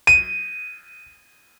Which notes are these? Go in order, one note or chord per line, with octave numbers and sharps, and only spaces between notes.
D#7